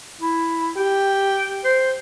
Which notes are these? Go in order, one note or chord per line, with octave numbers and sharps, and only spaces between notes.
E4
G4 G5
C5